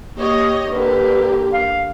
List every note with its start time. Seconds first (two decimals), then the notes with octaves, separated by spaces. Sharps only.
0.18 A#3 G4 C#5 D#5
0.72 D3 A#3 G4 B4
1.53 F5